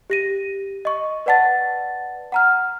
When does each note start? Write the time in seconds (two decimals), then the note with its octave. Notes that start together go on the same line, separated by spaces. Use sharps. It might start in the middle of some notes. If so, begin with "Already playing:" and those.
0.10 G4 A#6 D#7
0.85 D#5 C#6
1.26 B4 D5 F#5 A5 A6
2.32 F#5 A#5 F6